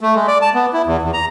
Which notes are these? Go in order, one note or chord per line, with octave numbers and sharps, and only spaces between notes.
A3
G#3
D5
A5
B3
E4
E2
E2
A#5